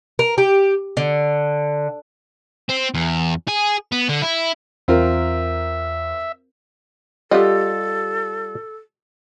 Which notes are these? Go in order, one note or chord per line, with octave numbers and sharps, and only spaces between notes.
A#4
G4
D3
C4
E2
G#4
B3
D3
E4
E2 C4 F4 A#4 E5
G3 F4 G4 A4 D#5 F#5